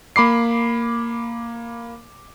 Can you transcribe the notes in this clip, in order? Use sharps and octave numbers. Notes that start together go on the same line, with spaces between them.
A#3 B5 D6 C7